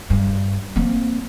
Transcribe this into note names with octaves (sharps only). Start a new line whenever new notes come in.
G2
A#3 C4